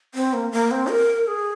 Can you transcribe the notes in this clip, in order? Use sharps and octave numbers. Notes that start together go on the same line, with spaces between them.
C4
A#3
A#3
C4
A#4
G#4